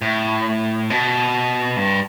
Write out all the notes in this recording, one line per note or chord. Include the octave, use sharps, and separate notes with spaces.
A2
B2
G2